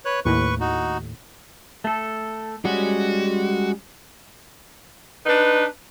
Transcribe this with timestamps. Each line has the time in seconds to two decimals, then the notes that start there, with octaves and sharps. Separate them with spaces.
0.05 B4 C#5 F#6
0.25 D#2 A2 B4 C#6
0.60 D#4 F#4
1.84 A3 A4
2.65 G3 G#3 C#4 F#4
5.26 D4 D#4 B4